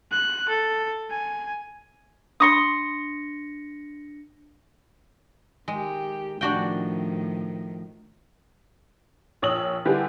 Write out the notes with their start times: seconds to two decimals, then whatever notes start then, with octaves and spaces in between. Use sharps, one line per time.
0.12 F#6
0.49 A4
1.11 G#5
2.40 D4 C6 C#6 D#6 A#6 C#7
5.68 D#3 G#3 G4
6.41 A2 D#3 F3 D4 F#4 G5
9.42 A#1 C#5 D#6 E6 F#7
9.85 D3 G3 E4 G4 G#4 B4